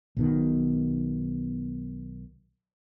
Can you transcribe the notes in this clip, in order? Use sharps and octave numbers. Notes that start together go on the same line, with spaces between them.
B1 B2 D#3